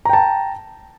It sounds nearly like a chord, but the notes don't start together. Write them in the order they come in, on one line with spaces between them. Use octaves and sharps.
A#5 G5 A5